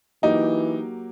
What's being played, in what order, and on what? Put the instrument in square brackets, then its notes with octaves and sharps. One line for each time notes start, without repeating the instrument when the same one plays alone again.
[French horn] E3 [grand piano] F#3 A#3 G4 [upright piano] D#4